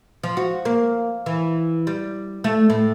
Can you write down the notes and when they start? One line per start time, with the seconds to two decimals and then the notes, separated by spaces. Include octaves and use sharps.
0.23 F3
0.37 F#4
0.65 A#3
1.26 E3
1.87 G3
2.44 A3
2.70 A2